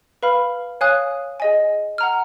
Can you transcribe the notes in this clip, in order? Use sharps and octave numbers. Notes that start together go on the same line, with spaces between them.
B4 F5 B5 F6
C#5 F5 G#5 D#6 F#6
G#4 D#5 G#5
F#5 A#5 F6